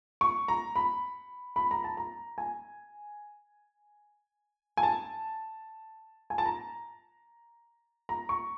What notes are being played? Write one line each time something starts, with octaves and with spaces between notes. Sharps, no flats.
C#6
A#5
B5
B5
A#5
A5
A#5
G#5
G#5
A5
G#5
A5
A#5
A#5
C#6